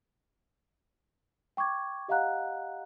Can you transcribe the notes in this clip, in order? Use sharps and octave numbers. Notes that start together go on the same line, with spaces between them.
G5 C#6 D6 G#6
G4 D#5 F5 F#5 A#5 F#6